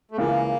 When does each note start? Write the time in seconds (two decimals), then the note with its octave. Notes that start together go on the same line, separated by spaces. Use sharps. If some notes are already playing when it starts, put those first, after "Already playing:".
0.11 A3
0.17 C#2 C#3 E3 A#3